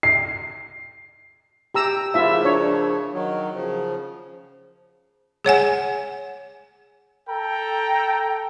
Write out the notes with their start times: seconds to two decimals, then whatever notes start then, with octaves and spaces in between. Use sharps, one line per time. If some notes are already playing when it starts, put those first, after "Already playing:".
0.03 C7
1.74 G4 A#5 E6
2.14 C#3 F3 A#3 E4 F4 E5
2.45 D4 C#5
3.13 D#3 F#3
3.54 C#3 F3
5.45 G#4 C#5 F#5 G#5
7.29 A4 G5 A#5